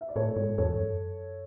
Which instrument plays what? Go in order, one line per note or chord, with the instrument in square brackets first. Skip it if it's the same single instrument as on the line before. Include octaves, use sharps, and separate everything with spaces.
[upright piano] E5
D5
[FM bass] A2 [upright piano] A4 C#5
[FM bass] G#2
[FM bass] E2 [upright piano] A4 C#5
[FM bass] G#2
F#2